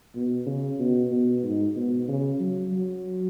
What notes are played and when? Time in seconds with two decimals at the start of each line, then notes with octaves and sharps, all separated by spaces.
0.15 B2
0.46 C#3
0.80 B2
1.11 B2
1.43 G#2
1.76 B2
2.08 C#3
2.40 F#3
2.72 F#3